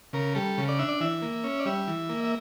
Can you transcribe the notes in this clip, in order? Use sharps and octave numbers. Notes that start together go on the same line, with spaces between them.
C#3 A#4
G3 A4
C#3
D5
D4 E5
D5
E3 E5
A#3
C#4
D5
G3 E5
E3
A#3
E5